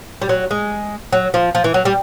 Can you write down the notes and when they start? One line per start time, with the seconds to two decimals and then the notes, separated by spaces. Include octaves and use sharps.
0.22 G3
0.29 F#3
0.51 G#3
1.12 F#3
1.34 F3
1.55 F3
1.64 E3
1.74 F#3
1.85 G3